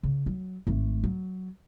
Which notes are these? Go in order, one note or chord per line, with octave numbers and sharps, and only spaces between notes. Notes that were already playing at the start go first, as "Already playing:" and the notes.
C#3
F#3
G#1 A3
F#3